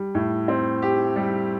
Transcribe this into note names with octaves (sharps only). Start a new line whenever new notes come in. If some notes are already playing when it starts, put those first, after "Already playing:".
Already playing: G3
A2
C4
G4
G3